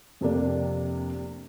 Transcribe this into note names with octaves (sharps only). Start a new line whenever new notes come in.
F2 C3 A#3 D4